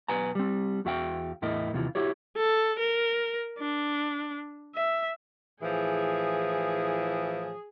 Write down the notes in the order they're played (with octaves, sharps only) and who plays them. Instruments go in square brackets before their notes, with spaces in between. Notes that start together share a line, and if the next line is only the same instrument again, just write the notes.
[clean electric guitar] B1 B2 B4 G#5 A#5
G3 C4
E2 F#4 E5 F5 G5
E2 A2 E4 A#4 D#5
D#2 C3 E3 F4
E4 F#4 G4 C#5
[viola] A4
A#4
D4
E5
[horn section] A2 E3 F3 [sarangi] G#4